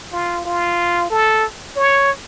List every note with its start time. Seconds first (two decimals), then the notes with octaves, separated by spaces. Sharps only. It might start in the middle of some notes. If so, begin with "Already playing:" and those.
0.13 F4
0.45 F4
1.11 A4
1.77 C#5